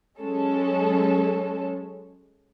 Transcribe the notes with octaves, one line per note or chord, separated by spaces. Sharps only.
F#3 G#3 C#4 A4